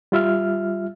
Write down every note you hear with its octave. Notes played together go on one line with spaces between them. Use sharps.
G3 F4 E5 F6